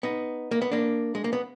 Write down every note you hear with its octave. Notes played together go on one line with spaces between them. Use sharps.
B3 D#4
A#3
B3
A#3 D4
G#3
A#3
B3